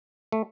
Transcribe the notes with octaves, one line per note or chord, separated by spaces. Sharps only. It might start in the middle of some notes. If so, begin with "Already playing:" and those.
A3